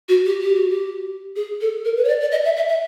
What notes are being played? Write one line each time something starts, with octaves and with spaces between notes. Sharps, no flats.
F#4
G4
G4
F#4
G4
G#4
A4
A#4
B4
C#5
D5
D5
D#5
E5
E5
E5